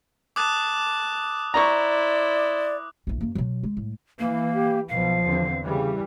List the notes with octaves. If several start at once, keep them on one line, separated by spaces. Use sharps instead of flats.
A5 D6 D#6 F#6
E4 C5 D5 A#5 C#6
A#1 E3
F#2 A#3
B2 F#3
G#3
A2
E3 A#3
G4
B1 B2 F3 F5
E2 D3 C4
C#3 E3 G3